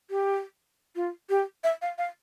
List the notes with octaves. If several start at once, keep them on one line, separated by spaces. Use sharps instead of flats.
G4
F4
G4
E5
F5
F5